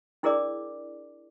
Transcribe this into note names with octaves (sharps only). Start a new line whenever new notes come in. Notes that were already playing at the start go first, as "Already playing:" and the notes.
D4 E4 G#4 A#4 D5 D6